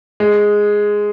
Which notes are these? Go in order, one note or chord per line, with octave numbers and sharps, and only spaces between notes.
G#3